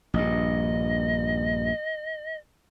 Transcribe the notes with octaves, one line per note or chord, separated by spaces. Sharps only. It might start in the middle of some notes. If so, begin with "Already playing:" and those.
A#1 G2 D#5